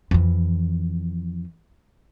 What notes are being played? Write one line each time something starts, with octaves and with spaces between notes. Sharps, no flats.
F2 E3